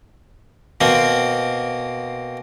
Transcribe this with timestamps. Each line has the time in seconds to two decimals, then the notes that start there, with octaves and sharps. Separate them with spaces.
0.81 B2 A#3 C4